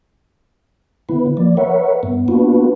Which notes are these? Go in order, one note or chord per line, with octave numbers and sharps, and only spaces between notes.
D3 B3 E4 B4
F3 A#3 D5
A#4 B4 C#5 E5 F#5
G2 B3
A#3 B3 D4 F4 F#4 B4